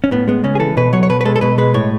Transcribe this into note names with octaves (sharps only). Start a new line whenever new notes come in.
C#4
A2 B3
G#3 B3
C#3 C#4
G#4
E3 A4
B2 B4
F#3 C#5
C#5
B2 B4
B4
G#3 A4
A4
B2 B4
G#3 B4
A2 C#5